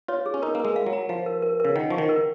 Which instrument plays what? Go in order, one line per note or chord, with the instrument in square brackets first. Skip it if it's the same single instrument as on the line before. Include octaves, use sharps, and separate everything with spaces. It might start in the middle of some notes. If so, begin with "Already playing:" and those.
[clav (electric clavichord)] F4 [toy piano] C#5
[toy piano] G#4
[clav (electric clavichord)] C#4
[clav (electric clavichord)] D#4 [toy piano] A#4
[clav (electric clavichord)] A#3
[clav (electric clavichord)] G#3 [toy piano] A#4
[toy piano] F5
[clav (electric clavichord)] F#3
[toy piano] A#5
[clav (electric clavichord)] F3 [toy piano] F5
[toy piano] A#4
A#4
[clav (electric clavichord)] C#3 [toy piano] A#4
[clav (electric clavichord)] D#3 [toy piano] F#5
[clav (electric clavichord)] F3 [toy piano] C#6
[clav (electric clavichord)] D#3
[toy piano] A#4